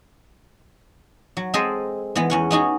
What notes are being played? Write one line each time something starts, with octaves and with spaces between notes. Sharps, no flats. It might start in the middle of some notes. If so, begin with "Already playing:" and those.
F#3
G#3 C4 G#4 A4 C5 D#5
E3 G#3 B3
E2 C#4 F#5
B3 D#4 F#4 G#4